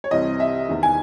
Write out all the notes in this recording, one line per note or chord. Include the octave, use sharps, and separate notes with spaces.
C#5
C2 C3 E3 D#5
E5
E2 D#3
G#5